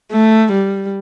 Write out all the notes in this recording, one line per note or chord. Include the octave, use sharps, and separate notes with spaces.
A3
G3